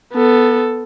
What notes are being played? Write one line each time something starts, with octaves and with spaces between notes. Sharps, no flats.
B3 A4